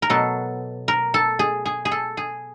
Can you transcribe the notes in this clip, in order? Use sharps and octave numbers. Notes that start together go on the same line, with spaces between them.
A#4
B2 F#3 A4
A#4
A4
G#4
G#4
G#4
A4
G#4